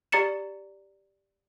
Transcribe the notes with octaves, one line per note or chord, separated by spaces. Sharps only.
G4 D5 A#5 A6 C#7 E7